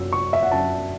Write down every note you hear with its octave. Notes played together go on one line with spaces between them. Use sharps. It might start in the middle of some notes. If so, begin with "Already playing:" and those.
Already playing: F#2 F#3 C#4 E6
C#6
E5
F#5
F#2 F#3 C#4 A5